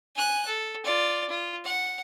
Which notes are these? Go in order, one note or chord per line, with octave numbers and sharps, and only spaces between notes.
G#5 F#6
A4
F4 D5
F4
F#5